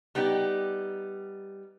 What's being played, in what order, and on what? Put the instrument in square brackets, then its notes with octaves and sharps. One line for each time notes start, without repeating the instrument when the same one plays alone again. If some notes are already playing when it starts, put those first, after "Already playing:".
[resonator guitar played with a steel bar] G3 B3 D#4 G4